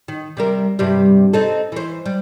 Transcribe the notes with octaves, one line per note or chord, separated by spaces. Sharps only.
D#3
C3 G3 A#4
G2 C3 G3
C4 D#4 A4
E3 C5
G3